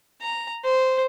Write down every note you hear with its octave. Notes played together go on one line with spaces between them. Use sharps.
A#5
C5